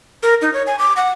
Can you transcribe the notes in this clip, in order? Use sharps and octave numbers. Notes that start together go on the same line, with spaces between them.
A#4
D#4
C#5
G#5
D6
F#5